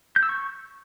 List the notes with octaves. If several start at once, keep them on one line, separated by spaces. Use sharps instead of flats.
G6
E6
C#6